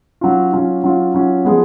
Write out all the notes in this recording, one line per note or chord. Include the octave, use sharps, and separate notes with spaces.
F#3 C#4 F4
F#3 C#4 F4
F#3 C#4 F4
F#3 C#4 F4
F3 G#3 B3